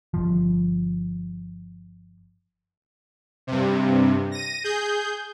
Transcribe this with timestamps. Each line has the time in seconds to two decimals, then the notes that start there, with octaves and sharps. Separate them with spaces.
0.14 G1 F3
3.47 G2 C3
4.32 A#6 D#7
4.64 G#4 G6